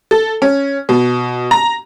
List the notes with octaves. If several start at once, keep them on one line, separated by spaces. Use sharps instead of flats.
A4
C#4
B2
A#5